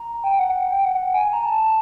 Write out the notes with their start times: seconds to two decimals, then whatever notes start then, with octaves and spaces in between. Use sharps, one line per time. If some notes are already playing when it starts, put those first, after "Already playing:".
Already playing: A#5
0.24 G5
0.39 F#5
0.69 G5
0.85 F#5
1.14 G#5
1.33 A#5
1.45 A5